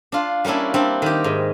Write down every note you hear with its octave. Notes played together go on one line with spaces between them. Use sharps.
D4 F4
G3 A#3 C#4 D4 E4
G3 C4 D4
D#3 G4
G#2